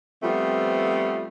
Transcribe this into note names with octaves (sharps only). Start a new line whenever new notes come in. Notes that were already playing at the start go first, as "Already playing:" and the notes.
F3 G3 A3 B3 C4 F4